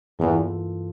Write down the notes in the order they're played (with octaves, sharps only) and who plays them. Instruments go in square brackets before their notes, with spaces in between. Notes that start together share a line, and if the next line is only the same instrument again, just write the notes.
[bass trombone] E2 [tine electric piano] G2 E3 A#3 F4 A4